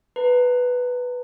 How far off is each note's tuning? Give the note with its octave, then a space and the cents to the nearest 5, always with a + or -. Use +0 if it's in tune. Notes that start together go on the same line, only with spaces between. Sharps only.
B4 +0 A#5 -35